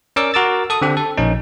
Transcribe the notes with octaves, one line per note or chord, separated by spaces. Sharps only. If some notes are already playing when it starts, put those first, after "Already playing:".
C#4 A#4 D5 D6 E6
F#4 A#4 D6 E6 A6
A4 D#6
D3 C4 G4
A4
A#1 C#4 D#4